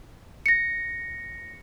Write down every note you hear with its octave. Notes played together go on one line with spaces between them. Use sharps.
A#6 C#7